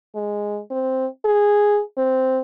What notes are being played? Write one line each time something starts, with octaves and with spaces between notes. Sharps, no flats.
G#3
C4
G#4
C4